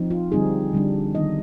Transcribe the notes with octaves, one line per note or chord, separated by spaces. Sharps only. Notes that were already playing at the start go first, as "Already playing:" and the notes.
Already playing: F3 C4 D#4
F4
D3 G3 C4 D#4 G#4
D3 G3 D4
D#3 B3 D#4 D#5